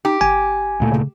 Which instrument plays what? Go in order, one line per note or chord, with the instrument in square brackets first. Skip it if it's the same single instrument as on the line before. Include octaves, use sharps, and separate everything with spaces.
[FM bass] D#4 [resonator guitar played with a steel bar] G4
[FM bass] G1 [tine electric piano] G#5
[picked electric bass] D2 A#2 A3
[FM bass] C#3